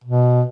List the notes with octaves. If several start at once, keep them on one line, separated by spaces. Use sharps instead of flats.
B2